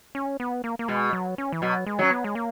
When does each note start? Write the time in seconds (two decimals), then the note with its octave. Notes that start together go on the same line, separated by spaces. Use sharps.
0.15 C#4
0.40 B3
0.64 A#3
0.79 A#3
0.88 B2 G#3
1.13 F#3
1.38 C#4
1.52 E3
1.62 B2 F#3
1.86 G#3
1.99 F#3 C#4
2.11 B3
2.24 G#3
2.35 A#3